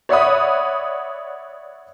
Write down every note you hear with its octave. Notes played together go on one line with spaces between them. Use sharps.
C#5 D5 E5 F#5 B5 D#6